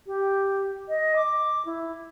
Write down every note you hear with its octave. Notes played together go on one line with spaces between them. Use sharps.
G4
D#5
D6
E4